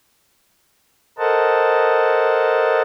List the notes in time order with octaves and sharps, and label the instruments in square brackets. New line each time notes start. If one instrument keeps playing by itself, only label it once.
[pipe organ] A4 A#4 C5 D#5 F#5 A5